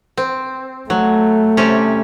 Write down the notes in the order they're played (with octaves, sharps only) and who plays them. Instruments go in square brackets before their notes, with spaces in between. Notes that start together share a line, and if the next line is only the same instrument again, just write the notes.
[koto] C4
[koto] F#3 [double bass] A3
[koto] C3 G3 C#4